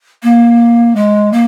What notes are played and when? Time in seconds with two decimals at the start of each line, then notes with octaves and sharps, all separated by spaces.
0.23 A#3
0.95 G#3
1.32 A#3